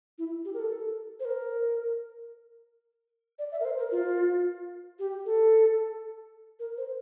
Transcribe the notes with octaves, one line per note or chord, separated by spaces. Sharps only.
E4
G4
A#4
A4
C5
A#4
D5
E5
A#4
C5
A#4
F4
G4
A4
A#4
C5